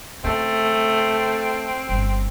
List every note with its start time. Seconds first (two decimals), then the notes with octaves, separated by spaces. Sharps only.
0.24 C#3 A3 C4
1.89 G1